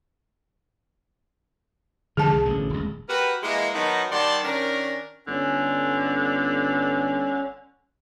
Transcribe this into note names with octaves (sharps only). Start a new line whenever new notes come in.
D3 F3 G#3 G#4 A5
C2
A1 B2 D3
D#1 C#2
F#4 G4 A#4 B4
E3 G#3 A#3
D#3 F#3 B3 D#4 A#4 A5
D#3 G3 D5 F#5 A5 C6
D#3 C#4 D4 A#4
G1 D3 C#4